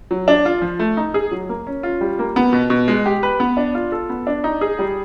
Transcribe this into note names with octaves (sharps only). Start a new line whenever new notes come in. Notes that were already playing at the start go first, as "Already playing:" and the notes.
F#3
D4
F4
F3
A3
D#4
G#4
F#3
A#3
C#4
F4
G3
A#3
B3
B2
B2
G#3
G4
B4
B3
D4
F4
A4
B3
D4
D#4
G#4
G3